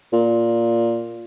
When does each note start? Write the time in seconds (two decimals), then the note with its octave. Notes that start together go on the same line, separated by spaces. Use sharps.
0.13 A#2